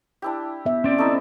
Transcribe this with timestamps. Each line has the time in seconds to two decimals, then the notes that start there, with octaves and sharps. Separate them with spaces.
0.22 D4 E4 G4
0.66 B3 E5
0.84 C4 C#4 D5
0.98 A3 D#4 E4